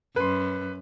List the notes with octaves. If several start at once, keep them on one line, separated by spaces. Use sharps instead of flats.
F#2 B4 C6